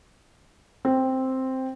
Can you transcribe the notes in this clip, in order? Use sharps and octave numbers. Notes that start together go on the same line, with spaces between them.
C4